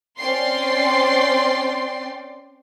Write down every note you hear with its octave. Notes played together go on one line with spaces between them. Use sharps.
C4 C#4 D5 G5 C6 C7